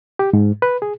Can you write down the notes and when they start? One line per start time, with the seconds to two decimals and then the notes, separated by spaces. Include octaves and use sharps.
0.19 G4
0.33 G#2
0.62 B4
0.82 G#4